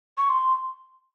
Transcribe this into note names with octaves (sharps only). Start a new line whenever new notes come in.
C#6
C6